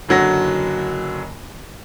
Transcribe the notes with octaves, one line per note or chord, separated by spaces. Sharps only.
F#1 D3 F#3 F#4 A#6